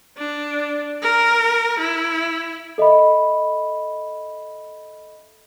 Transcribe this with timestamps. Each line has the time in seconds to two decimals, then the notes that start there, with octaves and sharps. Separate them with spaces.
0.17 D4
1.02 A#4
1.79 E4
2.78 A4 D#5 E5 B5